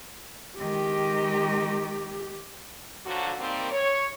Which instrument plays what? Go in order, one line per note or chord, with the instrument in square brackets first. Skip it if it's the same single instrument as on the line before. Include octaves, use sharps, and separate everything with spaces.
[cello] D#3 G#3 [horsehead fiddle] G4
[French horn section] D3 F3 F#3 F#4
D#3 G3 A#3 C4
C#5